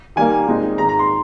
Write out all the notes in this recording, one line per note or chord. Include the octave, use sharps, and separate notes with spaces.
D#3 G3 A#3 G#5
A#2 G#3 C4 D#4
G#2 D#3 G#3 A#5
A#5
C6